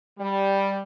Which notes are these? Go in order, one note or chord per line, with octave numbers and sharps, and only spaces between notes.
G3